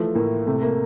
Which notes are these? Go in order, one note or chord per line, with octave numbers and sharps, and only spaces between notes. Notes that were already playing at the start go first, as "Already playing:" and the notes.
Already playing: E3 F3 A3
A2 A#3
C3 A3
A#3